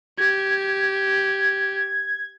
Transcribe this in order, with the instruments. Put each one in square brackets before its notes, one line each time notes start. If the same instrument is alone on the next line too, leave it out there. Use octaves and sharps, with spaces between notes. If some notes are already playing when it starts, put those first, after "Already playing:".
[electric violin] G4 [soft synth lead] G#6